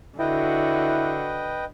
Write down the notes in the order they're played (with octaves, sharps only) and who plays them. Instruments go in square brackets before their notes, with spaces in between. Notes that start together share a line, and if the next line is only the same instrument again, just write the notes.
[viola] D3 F#4 [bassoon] E4 [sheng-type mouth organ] B4 D#5 G5